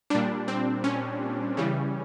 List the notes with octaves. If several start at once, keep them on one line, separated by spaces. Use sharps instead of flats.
A#2 G3 D4
C4
C#4
C#3 E3 G3